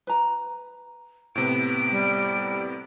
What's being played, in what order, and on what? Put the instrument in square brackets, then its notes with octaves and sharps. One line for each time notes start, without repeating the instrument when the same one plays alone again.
[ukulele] B4 A#5
[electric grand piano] A2 C3 B3 [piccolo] D7
[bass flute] G3